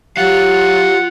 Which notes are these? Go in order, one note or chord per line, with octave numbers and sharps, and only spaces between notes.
F#3 F4 G4 F5 F#5